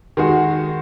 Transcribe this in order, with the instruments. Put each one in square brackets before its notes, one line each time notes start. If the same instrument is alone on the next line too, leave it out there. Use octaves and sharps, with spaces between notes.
[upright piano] D#3 G#3 F#4